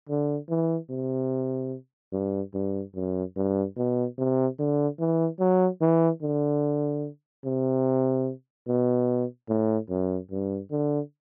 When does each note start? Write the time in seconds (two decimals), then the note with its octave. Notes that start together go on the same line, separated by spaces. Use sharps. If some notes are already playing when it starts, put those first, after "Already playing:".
0.09 D3
0.49 E3
0.90 C3
2.13 G2
2.54 G2
2.95 F#2
3.36 G2
3.77 B2
4.18 C3
4.59 D3
5.00 E3
5.40 F#3
5.81 E3
6.22 D3
7.45 C3
8.68 B2
9.49 A2
9.90 F#2
10.31 G2
10.71 D3